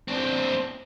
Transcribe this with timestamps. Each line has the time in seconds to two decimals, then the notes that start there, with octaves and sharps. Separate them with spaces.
0.08 C4 D4